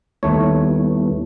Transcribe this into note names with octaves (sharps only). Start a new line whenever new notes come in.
D#2 G3 A3 B3 E4 C#5